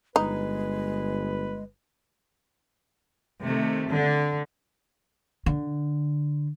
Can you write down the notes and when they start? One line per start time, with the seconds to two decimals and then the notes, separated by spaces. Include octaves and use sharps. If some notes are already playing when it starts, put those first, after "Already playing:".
0.16 G1 G#3 D#4 B4
3.45 C3 D#3 A3
3.90 D3
5.46 D3